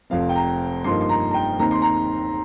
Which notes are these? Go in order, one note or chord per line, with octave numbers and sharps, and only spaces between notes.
F1 F2 F3 C4 F5
G5
A#5
G2 F3 A#3 D#4 C6
C6
A#5
A#5
G5
D#2 D#3 C4 D#4 A#5
C6
A#5